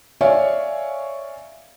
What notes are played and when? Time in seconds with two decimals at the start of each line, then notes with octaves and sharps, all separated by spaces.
0.21 C#5 D5 E5 F5 G#5